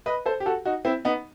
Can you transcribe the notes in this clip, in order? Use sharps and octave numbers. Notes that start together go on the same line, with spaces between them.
B4 D#5
A4 C5
G4
F#4 A4
D#4 F#4
C4 E4
B3 D#4